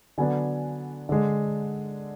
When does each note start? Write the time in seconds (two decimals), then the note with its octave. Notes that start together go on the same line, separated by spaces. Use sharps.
0.18 D3 F#3 B3 D4 G#5
1.09 D3 G#3 D4